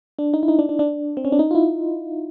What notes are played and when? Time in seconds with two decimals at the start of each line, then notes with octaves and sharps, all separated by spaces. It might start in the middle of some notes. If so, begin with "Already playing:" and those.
0.19 D4
0.34 D#4
0.43 E4
0.48 D#4
0.59 D4
0.69 D4
0.79 D4
1.17 C4
1.25 C#4
1.32 D4
1.39 D#4
1.51 F4
1.55 E4